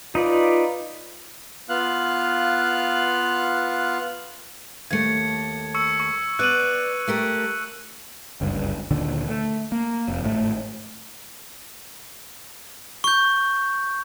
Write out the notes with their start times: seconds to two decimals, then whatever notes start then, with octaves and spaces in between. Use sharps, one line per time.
0.15 D#4 F4 B4 D5
1.69 B3 F4 F5 F#6
4.91 D#2 A3 G#6 C#7
5.74 C#6 E6 C#7
6.00 C#6
6.39 B3 D5 F#6 D#7 F#7
7.08 A3 G4 A#4
8.41 F#1 C#2 G2 D3
8.91 D2 A#2 D3 D#3
9.29 A3
9.72 A#3
10.08 F1
10.22 G#1 A2 C3 A3
13.04 C#6 G6